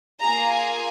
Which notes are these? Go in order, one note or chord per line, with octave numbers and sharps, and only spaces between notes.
A#3 F4 G#4 A#5
G#5